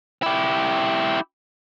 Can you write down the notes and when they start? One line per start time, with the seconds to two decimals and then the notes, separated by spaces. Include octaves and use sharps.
0.23 E4 G4